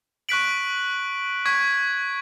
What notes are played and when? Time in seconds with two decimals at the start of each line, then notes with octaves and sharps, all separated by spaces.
0.29 C#6 F#6 B6 D7 F#7
1.46 C#6 G#6 B6